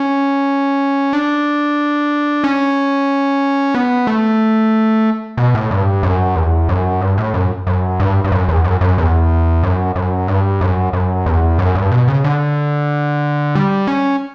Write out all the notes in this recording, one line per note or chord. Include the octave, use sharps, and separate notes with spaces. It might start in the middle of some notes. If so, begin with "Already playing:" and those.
Already playing: C#4
D4
C#4
B3
A3
B2
A2
G2
F#2
E2
F#2
G2
A2
F#2
F#2
G2
G2
F#2
E2
F#2
F#2
E2
F#2
F#2
G2
F#2
F#2
E2
F#2
G2
B2
C#3
D3
G3
C#4